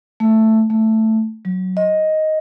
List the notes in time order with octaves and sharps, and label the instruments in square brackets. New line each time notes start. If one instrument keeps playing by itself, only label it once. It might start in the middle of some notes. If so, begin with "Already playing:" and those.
[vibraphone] A3
A3
F#3
D#5